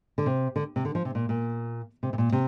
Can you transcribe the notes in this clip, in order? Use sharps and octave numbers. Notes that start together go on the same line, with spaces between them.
D3
C3
D3
C3
D3
F3
C3
A#2
A#2
C3
C3
A#2
C3